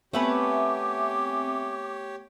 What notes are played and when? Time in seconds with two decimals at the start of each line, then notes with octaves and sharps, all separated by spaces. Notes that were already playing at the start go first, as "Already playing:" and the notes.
0.13 A3 B3 C4 G4 B4 C#5 E5 G#5
0.29 D6